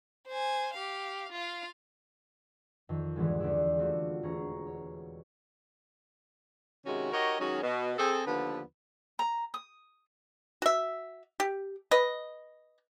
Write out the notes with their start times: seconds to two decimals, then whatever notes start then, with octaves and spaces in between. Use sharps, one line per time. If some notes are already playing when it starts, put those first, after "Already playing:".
0.28 C5 G#5
0.73 G4 F5
1.32 F4 F5
2.89 F2 D#3
3.16 E2 G#2 D3 E3 G3 G#3
3.40 E2 D3 G#4 D5 E5
3.78 G3 A3 C4 F4 F#4
4.23 E1 G#4 A#5 C#6
4.67 C#5
6.86 C3 D#3 G#3 C#4 F#4
7.12 D#4 F#4 G4 A#4 C#5 D#5
7.39 D#3 F#3 G#3 C#4 D#4 F#4
7.63 B2
7.98 C4 G#4 A4
8.26 D#2 D3 F3 B3 B4
9.19 A#5
9.54 D#6
10.62 F#4 E5
11.40 G4
11.91 B4 D#5